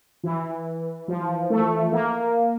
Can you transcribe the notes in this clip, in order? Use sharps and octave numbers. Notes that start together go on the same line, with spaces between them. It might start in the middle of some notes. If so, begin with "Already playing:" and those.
E3
F3
A3
A#3